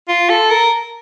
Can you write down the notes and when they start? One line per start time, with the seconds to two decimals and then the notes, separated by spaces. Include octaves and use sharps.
0.09 F4
0.30 A4
0.51 A#4